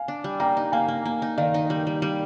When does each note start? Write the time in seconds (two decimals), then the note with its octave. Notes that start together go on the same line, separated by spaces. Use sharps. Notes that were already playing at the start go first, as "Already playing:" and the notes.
Already playing: F5 G#5
0.08 D4
0.24 G3
0.40 A#3 G5 A#5
0.57 D#4
0.72 A#3 F5 G#5
0.88 A#3
1.06 A#3
1.22 D#4
1.38 D#3 D5 F5
1.54 D#4
1.70 G3
1.87 G3
2.02 G3